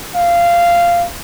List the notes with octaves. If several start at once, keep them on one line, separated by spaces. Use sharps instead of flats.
F5